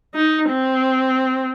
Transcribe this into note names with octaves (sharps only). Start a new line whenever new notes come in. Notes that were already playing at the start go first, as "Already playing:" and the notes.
D#4
C4